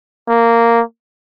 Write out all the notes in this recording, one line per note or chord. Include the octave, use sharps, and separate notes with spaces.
A#3